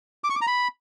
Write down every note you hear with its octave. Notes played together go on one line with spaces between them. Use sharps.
D6
C#6
D6
A#5
B5